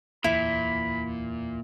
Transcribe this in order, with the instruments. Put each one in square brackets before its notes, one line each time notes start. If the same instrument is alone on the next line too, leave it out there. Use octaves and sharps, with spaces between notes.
[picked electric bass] D1 E2 [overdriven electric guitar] A#2 [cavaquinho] E4 [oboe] B5